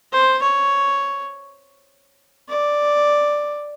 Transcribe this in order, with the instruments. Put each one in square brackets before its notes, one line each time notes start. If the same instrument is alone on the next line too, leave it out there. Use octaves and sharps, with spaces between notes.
[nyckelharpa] C5
C#5
D5